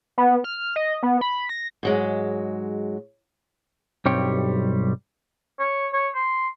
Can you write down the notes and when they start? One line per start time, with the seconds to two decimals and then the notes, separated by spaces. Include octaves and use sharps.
0.18 B3
0.44 F6
0.76 D#5
1.03 B3
1.21 B5
1.49 A#6
1.83 G#2 F#3 G#3
4.05 B1 G2 G3 C4 C#5 G5
5.60 C#5
5.93 C#5
6.15 C6